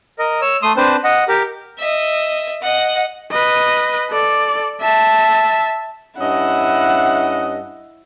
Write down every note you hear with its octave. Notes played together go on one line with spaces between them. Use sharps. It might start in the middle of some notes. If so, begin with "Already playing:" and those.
A#4 D#5
C#5 E6
A3 C6 D#6
C4 D4 B4 C5
D#5 F#5
G4 A#4
D#5 E5
D#5 F#5
B4 D#5
A4 D5
E5 A5
G2 C#4 E4 D#5 F#5